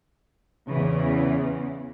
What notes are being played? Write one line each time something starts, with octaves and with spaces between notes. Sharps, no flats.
E2 C#3 E3